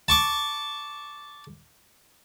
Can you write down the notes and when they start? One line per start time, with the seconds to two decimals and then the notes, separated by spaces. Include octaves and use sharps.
0.08 A5 C#6 D6